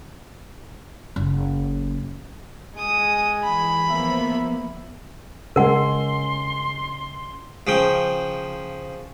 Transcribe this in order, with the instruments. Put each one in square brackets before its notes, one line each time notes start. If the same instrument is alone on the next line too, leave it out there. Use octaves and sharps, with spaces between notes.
[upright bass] F#1
[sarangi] G#3 [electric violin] D#6
[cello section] E3 [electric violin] B5
[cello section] F3 A#3 B3 [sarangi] E5
[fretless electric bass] C#3 G#3 [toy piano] A#4 F#5 [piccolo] C6
[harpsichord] C#3 F3 G5